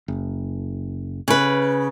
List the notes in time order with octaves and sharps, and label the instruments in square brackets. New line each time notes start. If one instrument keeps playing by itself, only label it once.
[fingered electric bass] F#1
[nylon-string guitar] C#3 B4